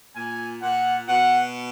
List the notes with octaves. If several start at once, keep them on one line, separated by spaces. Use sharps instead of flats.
A#2 G#5
A#2 F#5
B2 F#5